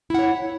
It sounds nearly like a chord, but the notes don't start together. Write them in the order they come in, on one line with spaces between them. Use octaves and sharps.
E4 F#5 C#5